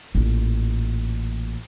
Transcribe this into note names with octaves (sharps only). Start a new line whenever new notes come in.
A1 A#2